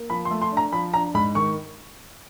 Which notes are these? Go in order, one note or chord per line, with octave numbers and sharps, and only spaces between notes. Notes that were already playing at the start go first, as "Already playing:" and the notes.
Already playing: A#3
F3 B5
C6
A3
C6
D4
A#5
F3 B5
D4 A#5
G#2 B5
D#3 C#6